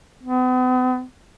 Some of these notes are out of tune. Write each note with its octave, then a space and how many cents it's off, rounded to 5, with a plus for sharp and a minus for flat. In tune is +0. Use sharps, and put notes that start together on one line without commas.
B3 +45